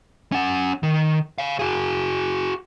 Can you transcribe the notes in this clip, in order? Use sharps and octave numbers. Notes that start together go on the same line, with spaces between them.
C#4 F#5
D#3
C#5 F5
F#4 G#4